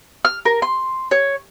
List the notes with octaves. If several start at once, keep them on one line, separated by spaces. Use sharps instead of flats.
F6
A#4
C6
C#5